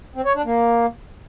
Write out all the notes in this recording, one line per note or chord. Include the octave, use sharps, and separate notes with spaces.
C4
C#5
D4
A#3